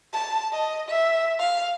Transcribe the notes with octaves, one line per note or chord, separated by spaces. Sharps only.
A5
D#5
E5
F5